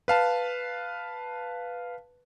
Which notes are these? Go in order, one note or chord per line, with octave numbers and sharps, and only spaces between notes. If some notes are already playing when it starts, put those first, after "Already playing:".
B4 F5 A5